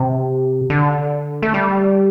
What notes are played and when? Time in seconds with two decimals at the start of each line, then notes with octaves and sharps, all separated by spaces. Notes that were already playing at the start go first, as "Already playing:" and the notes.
Already playing: C3
0.70 D3
1.42 A3
1.54 G3